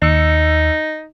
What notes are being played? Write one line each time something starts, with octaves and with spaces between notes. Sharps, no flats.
D#2 D#4 E6 C#7